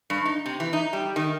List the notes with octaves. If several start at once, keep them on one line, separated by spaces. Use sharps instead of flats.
G2
D#4
C3
E3
D#4
G3
D#3